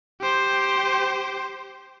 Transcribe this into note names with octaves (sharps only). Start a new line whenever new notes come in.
G4 C5